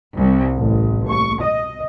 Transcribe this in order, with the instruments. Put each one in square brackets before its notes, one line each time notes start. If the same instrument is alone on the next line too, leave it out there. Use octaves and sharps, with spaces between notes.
[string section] C2
A1
C#6
D#5